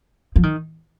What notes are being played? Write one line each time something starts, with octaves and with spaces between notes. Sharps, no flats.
F3
D#3